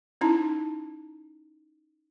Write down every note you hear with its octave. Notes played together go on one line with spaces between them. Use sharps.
C#4 D#4 E4 A5 A#5